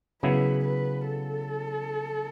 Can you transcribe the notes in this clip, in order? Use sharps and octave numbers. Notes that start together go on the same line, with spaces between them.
C#3 F#3 B3 E4 B4
B4
A4